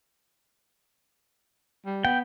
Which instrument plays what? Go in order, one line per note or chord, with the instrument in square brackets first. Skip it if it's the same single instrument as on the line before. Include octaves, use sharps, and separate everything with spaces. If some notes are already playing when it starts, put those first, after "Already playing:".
[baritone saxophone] G3
[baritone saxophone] B3 [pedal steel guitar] G5